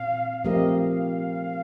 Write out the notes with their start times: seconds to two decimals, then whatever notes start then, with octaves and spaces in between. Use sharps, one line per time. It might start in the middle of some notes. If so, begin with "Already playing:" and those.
Already playing: A#2 C4 F5
0.44 F3 A3 C4 G4 A#4 D#5
0.77 F5